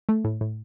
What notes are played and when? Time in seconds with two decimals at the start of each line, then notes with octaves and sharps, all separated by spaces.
0.09 A3
0.25 A2
0.41 A2